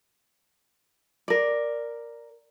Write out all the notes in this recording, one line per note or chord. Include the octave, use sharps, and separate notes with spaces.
A#4 D5